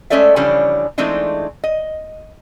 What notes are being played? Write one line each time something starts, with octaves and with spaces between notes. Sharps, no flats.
G#3 A3 C#4 A4 D5 E5
C#3 E3 F3 G3 C#4 D4
E3 G#3 A3 C4 D4 D#4
D#5